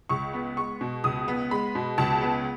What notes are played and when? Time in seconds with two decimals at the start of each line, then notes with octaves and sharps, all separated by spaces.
0.09 C#2 C#6
0.33 B3
0.57 G#3 C#6
0.81 B2
1.04 C#2 D#6
1.28 B3
1.51 G#3 B5
1.75 B2
1.98 C#2 A5
2.22 B3